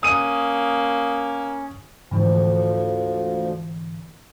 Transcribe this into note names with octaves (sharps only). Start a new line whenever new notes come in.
A#3 C#4 D#6 D#7
D2 G#2 D3 E3 F3